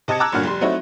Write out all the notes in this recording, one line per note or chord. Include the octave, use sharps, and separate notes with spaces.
C3 D#5 A5 G#6 C#7
A5 A#5 D6 E6 F#6 G#6
G1 G2 A#2 D3 F#4 F6
F1 G3 C6
F#3 A3 C4 D#4 E4 F#4